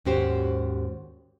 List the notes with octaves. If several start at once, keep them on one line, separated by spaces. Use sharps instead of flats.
D#2 G#2 C#4 F#4 G4 C5